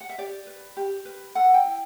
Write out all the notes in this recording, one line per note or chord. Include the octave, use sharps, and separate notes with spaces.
F#5
E5
G4 D5
B4
G4
B4
A4 F#5
G5
E4